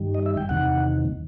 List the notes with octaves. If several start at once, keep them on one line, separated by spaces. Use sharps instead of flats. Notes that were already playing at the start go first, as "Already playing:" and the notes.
Already playing: G2 D#3 G3
D#5
E5
G5
E2 C3 D#3 F#5